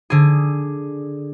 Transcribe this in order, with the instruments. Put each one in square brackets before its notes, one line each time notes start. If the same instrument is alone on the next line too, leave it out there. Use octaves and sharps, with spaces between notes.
[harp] D3 G#4